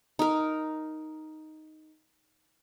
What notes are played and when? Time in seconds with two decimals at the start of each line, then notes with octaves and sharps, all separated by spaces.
0.19 D#4 A#4